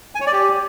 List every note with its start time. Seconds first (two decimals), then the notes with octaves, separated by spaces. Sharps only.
0.15 G#5
0.21 C#5
0.27 D5
0.33 G4